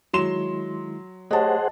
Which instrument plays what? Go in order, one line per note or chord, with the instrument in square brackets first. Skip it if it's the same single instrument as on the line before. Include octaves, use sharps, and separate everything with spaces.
[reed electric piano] D#3 G#3 E4 [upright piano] F#3 C6 E7
[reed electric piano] A3 G4 C#5 [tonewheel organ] G#4 C5 F#5 [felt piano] D#5 A5